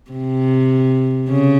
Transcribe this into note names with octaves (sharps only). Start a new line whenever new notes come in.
C3
C#3